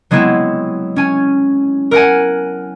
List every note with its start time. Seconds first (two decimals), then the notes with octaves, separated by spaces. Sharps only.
0.11 F#3 G#3 B3 C4 E4
0.96 C#4 G#5
1.91 A#4 F#5 G#5